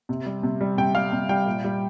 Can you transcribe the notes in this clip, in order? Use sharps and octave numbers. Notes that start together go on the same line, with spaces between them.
C3
G3
C3
G3
C3 G5
G3 F5
C3
G3 G5
A#2
G3